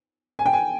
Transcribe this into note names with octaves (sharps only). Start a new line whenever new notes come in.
G#5
G5
G#5